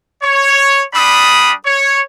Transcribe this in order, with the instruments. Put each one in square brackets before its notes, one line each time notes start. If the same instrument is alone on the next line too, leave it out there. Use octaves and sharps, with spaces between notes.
[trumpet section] C#5
G3 D4 B5 D#6
C#5